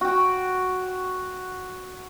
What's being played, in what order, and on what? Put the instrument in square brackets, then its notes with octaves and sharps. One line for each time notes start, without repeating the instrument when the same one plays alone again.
[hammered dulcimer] F#4 G5